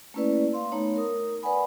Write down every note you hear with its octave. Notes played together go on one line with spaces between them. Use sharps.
A3 A#3 C#4 E4 B4 D5
F5 C6
A3 B3 D#4 C#5 A#5
A#4 D#6
B4 D5 F#5 G#5 B5